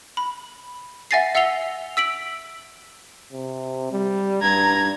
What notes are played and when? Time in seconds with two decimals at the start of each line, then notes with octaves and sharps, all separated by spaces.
0.17 B5
1.11 E5 F#5 G#5 A6 A#6 C7
1.35 E5 F#5 E6 C7 F7 G7
1.97 E6 B6 D7 F#7
3.33 C3
3.92 G3
4.42 G2 A#5 G#6